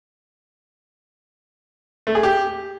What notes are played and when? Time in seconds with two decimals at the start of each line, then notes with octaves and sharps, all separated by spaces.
2.07 A3
2.15 G#4
2.23 G4